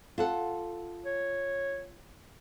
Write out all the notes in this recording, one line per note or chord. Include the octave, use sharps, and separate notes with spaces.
F4 A4 F#5
C#5